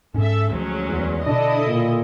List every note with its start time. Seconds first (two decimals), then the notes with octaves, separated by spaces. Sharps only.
0.14 G#2 C#4 A4 E5
0.50 D2 F3 F#3 G#3 C#4
0.87 E2
1.26 B2 D3 D4 E4 A4 D#5
1.67 A#2